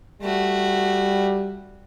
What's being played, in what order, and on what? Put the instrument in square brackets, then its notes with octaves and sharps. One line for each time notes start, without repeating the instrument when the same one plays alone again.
[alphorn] G3 [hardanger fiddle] A3 F#4